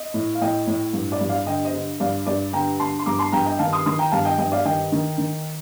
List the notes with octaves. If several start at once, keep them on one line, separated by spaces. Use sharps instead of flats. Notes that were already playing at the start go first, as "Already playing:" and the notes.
Already playing: D#5
A2
F5
A2 D#5 G5
A2
G2
D5
G2
D5 F5
D3 D#5 G5
C5 D#5
D3
G2 D5 F5
G2 D5
D3 G5 A#5
D3 A5 C6
C6
G2 A#5 D6
A5 C6
G2 G5 A#5
D#5 G5
D#3 F5 A5
C6 D#6
D#3 C6 D#6
G5 A#5
G2 F5 A5
D#5 G5
G2 D#5 G5
D5 F5
D#3 D#5 G5
D#3
D#3